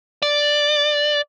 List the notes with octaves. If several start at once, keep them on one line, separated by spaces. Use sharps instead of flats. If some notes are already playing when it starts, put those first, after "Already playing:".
D5